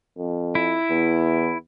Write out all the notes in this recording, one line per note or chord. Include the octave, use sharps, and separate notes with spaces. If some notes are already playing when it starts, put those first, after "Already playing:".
F2
E4
E2